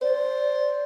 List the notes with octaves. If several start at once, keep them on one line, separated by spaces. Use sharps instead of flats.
C5 D5